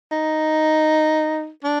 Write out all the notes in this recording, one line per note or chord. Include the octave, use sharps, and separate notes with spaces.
D#4
D4